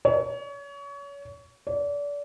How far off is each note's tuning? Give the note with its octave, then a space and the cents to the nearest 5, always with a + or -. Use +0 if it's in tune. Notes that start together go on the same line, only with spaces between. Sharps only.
C#5 +30
D5 -30